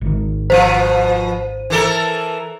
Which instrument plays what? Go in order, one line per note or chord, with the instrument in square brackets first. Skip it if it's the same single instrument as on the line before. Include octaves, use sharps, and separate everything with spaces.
[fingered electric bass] G#1 D#3
[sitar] B2 F3 [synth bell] C5 D#7
[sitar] E3 A4 A#4